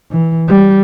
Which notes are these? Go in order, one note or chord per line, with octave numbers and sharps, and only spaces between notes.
E3
G3